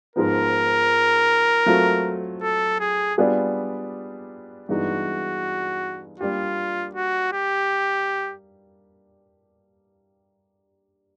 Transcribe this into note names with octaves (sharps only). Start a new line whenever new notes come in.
G#2 F3 G#3 B3 D#4 A#4
F#3 A3 C4 F4
A4
G#4
G3 B3 D4 F4 G#4
G2 E3 G#3 B3 D#4 F#4
G3 A#3 D4 F4 G4
F#4
G4